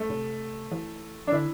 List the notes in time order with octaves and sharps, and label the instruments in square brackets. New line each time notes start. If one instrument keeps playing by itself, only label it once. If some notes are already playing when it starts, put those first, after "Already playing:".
Already playing: [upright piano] A3
[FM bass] C3
E3
[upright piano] D4
[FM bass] D3 [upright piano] E4